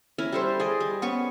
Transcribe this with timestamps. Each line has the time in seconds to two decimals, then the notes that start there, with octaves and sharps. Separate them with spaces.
0.18 C#4 E4 A#4
0.32 G3 A4 C5
0.60 G#4 D5 D#5
0.80 G3
1.02 B3 C#4 C#6